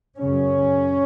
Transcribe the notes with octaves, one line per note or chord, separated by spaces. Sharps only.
F#2 C#3 C#4